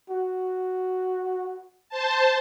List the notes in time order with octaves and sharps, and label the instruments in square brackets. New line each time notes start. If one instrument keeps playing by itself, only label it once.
[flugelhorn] F#4
[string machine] C5 A5